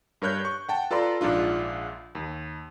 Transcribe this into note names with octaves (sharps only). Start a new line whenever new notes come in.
G2 A#4 C#5 F#6 G6
C#6
F#5 G5 A5
F4 A4 B4 D5 A#5 C6
A#1 G#2 D4 F4
D#2